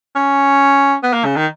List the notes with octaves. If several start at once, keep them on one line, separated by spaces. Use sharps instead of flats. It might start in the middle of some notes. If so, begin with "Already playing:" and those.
C#4
B3
A#3
C#3
D#3